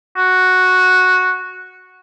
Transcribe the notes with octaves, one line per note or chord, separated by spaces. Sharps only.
F#4